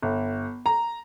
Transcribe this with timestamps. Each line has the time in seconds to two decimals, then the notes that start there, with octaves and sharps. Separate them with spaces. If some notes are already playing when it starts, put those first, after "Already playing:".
0.02 G1
0.66 A#5